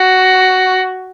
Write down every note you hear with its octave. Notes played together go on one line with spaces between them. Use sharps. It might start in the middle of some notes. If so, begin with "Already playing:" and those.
Already playing: F#4